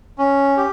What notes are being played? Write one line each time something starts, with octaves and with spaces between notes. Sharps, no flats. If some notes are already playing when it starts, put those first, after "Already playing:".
C#4
G4